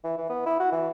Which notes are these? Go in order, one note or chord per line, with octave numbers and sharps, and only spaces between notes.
E3
E3
B3
E4
F#4
E3